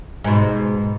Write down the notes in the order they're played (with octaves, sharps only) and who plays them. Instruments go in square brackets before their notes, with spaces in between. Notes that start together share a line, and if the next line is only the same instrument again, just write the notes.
[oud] G#2 B2